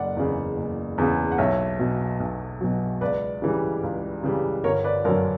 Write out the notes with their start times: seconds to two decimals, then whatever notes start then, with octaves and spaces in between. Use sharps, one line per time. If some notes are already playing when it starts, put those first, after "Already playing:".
Already playing: F#1 D5 F#5
0.16 E2 C#3
0.57 F#1
0.98 E2 C#3
1.32 F#5
1.38 B1 C#5 E5
1.79 B2 F#3
2.20 B1
2.61 B2 F#3
3.01 C#2 B4 D5
3.42 C#3 E3 G3
3.83 C#2
4.24 C#3 E3 G3
4.64 G1 A#4 C#5
4.84 B4 D5
5.04 F#2 D3 F#3 A#4 C#5